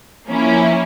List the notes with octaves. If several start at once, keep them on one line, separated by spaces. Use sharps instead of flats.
F3 A#3 C#4 E4